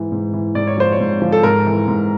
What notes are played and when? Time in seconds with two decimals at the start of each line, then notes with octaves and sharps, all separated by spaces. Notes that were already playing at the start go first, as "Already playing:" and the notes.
Already playing: G#2 E3
0.12 G#2
0.33 E3
0.55 G#2 D5
0.67 C#5
0.77 F3 C5
0.92 C#5
1.00 G#2
1.22 F3
1.32 A4
1.43 G#2 A#4
1.66 E3
1.88 G#2